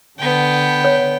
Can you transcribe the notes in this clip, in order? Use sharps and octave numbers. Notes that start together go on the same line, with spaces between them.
D3 B3 G5
C#5